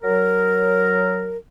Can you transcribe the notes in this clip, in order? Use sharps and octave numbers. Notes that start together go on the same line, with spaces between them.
F#3 A#4